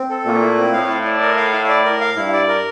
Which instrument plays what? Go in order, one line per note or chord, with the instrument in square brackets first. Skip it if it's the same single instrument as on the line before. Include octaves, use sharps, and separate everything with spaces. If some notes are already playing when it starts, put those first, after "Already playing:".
Already playing: [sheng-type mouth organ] C4
A4
[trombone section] A#2 [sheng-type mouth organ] A3
[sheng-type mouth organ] E4
C4
[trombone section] A2 [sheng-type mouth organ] F5
[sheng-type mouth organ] E4
D5
A#4
F5
E4
D5
A#4
F5
[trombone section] G2 [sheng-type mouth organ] E4
[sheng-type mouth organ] D5
A#4